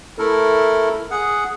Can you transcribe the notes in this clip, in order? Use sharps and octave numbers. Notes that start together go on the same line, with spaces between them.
A3 E4 A4 A#4
G#4 F#5